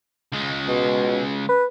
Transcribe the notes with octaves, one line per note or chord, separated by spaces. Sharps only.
C#2 G#3
B2
B4